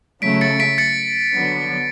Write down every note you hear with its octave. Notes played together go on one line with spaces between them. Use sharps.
C#3 F#3 A3 B6 D7
A6 C#7
B6 D7
A6 C#7
D3 F#3 B3